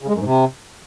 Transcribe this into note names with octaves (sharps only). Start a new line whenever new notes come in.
C#3
G#3
F#2
G#2
C3